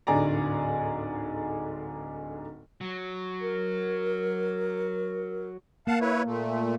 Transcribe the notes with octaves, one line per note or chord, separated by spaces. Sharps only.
D1 G#2 D3 G#4 D5 A#5
F#3
A#4
A#3 F5 F#5 A5
E4 B4 C#5
A#2 A3